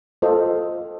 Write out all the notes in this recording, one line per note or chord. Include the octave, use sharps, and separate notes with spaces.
F4 A4 C5 D#5